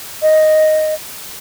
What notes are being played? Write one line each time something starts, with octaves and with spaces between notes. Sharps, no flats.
D#5